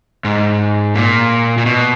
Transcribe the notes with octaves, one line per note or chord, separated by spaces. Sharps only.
G#2
A#2
A#2
B2